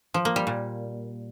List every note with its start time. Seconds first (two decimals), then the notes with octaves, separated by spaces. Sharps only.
0.14 F3
0.25 A#3
0.36 G3
0.47 A#2